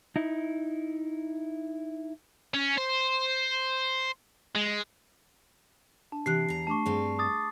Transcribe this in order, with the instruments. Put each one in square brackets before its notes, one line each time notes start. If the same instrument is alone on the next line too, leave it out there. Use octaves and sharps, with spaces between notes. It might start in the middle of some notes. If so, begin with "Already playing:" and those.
[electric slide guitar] D#4 E4
[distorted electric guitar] C#4
C5
G#3
[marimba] D4 [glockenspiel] A5
[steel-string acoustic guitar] C3 E3 [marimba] G4 F#6 [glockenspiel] C7
[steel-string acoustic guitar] E2 A#5
[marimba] A3 D4 D6 [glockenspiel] A5 C#6
[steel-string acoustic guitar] G2 C4 F5 [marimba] G#4
[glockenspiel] D6 D#6 A6